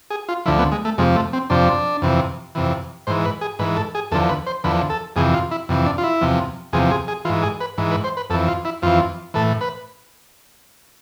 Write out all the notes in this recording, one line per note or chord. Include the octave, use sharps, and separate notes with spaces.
G#4
F4
D2 D3 F3 E4
B3
G#3
A3
F2 C3 F3 G#3
A3
C4
F2 C3 F3 D4
F2 C3 E3
F2 C3 E3
G#2 E3 C5
B4
G#4
G#2 E3 B4
A4
G#4
E2 D3 F3 A4
B4
C5
E2 D3 F3 B4
A4
F2 C3 E3 G#4
F4
E4
F2 C3 E3
D4
F4
E4
E2 C3 F3
E2 C3 F3 G#4
G#4
G#4
G#2 E3 F4
G#4
B4
G#2 E3
B4
C5
B4
F2 E3 A4
F4
E4
F2 E3 F4
A2 E3 A4
B4